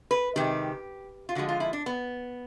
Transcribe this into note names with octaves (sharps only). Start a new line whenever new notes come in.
B4
C3 D#3 G#3 G4
F4
D3 F3 G#3 F#4
F4
E4
D4
B3